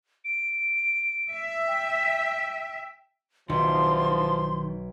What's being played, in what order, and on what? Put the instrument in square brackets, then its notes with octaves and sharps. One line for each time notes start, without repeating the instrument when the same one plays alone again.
[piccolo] D7
[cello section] E5
[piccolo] G5
[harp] B1 [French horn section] E2 F3 [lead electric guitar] D#3 [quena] C6